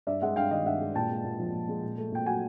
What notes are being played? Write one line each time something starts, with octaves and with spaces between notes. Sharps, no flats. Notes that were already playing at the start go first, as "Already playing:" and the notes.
G2 D5 E5
G#3 E5 F#5
G2 F5 G5
D#3 D#5 F5
G2 E5 F#5
G#3
A#2 G5 A5
G#3
A#2
F3
A#2
G#3
A#2
A3
A#2 G5
F#3 F#5 G#5